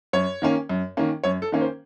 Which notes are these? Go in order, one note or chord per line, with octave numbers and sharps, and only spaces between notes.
F#2 C#5
D#3 A#3 C#4
F#2
D#3 A#3 C#4
F#2 C#5
A4
D#3 A#3 C#4
C5